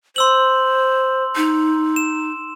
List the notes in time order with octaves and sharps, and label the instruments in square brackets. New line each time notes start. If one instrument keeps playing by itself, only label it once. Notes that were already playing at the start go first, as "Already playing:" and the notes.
[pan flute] C5 [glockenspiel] C6 E6 F#7
[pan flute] D#4
[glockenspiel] E7